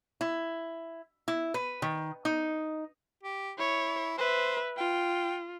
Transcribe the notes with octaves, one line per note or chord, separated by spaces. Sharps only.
E4
E4
B4
D#3
D#4
G4
E4 C#5
B4 C5 E5
F4 G5